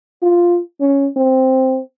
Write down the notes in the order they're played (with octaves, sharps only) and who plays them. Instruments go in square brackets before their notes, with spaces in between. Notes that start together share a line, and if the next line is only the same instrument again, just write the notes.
[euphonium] F4
C#4
C4